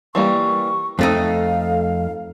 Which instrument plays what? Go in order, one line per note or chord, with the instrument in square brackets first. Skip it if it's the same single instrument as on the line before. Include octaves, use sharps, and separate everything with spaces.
[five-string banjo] E3 G3 A#3 [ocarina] C#6
[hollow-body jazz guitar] F2 A3 D#4 [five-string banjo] C4 [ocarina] F5